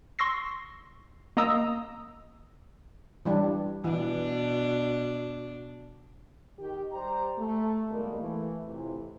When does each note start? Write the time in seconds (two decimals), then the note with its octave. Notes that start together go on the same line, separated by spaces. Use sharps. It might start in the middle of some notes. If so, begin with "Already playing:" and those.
0.19 C6 C#6 E6 A#6 C7
1.37 A#3 D#5 A#5 D#6 E6
3.25 E3 G3 D4
3.84 B2 E3 D4
6.59 D#3 G4
6.93 G3 G4 C5 G5 A#5
7.39 A3
7.91 E2 B2 D#3 G3 G#3 A#3
8.20 E3 A3
8.66 F2 A2 C3 E3